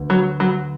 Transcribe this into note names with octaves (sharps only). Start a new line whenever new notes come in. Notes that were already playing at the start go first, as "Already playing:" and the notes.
Already playing: D2 B3
F#3
F#3